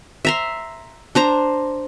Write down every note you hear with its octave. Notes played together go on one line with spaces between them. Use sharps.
E5 A#5 C6
D4 C5 A#5